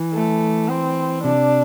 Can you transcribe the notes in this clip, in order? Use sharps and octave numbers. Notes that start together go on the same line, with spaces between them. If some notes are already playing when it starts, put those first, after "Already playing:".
Already playing: E3
A3
C4
C3 D4